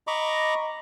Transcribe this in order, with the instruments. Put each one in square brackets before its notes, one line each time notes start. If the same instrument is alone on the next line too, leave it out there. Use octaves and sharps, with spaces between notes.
[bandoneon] D#5 A#5 B5 C#6 D6